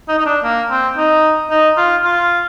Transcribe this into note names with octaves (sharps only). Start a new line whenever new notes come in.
D#4
D#4
D4
A#3
C4
D#4
D#4
F4
F4